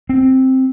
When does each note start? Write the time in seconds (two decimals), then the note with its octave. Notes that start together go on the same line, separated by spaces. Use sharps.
0.09 C4